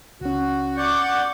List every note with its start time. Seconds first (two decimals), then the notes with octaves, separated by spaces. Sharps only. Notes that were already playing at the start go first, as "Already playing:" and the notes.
0.21 C#2 C#4 F#4
0.77 D5 F#5 C#6 D6 G6